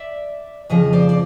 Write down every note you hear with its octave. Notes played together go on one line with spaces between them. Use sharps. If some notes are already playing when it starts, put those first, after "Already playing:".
Already playing: D5 E5
F2 C#3 F3 D#5
C5 D5
D5